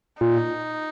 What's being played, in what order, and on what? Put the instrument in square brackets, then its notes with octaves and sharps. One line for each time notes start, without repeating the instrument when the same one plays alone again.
[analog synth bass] A#2 [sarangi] D#4